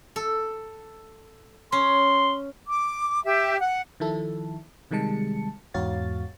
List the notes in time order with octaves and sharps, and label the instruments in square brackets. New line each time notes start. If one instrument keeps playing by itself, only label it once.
[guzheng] A4
[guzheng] C#4 [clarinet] C6
[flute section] D6
G4 E5
F#5
[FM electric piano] D#3 F3 E4 A4
C3 D#3 G3 G#3 A5 C#7
E2 G#2 F#4 C#5 F5 A6